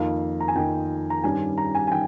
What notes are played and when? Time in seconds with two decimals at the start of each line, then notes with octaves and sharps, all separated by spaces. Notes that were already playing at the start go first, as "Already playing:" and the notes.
Already playing: F2 D#3 A#3 D#4 F5
0.40 A#5
0.48 G#5
0.55 F2 D#3 A#3 D#4 G5
1.10 A#5
1.24 G2 D#3 G3 C#4 G#5
1.58 A#5
1.75 G#5
1.87 G#5
1.92 D#3 G5